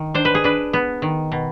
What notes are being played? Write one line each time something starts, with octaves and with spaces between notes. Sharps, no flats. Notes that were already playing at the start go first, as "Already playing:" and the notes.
Already playing: D#3
D4 C5
B4
G#4
D4 B4
B3
D#3
B2